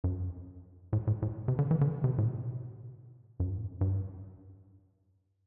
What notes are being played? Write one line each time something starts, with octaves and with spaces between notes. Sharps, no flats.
F#2
A2
A2
A2
C3
D3
E3
D3
C3
A2
B2
F#2
G2
A2
G2